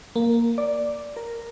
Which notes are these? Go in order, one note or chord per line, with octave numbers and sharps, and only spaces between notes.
A#3
D5
A#4